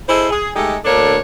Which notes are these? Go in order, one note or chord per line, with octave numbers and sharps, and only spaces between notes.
E4 G#4 A4 C5 D#5
G#4
G#3 A3 D#4 G4 A4
D2 A#3 D4 A4 C#5